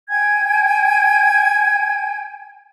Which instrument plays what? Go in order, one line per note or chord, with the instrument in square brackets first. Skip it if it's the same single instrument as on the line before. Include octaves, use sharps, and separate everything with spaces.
[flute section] G5 G#5 G6 G#6